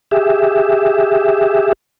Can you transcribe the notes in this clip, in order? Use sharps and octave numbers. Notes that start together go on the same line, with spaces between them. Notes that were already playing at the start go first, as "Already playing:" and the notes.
G4 G#4 E5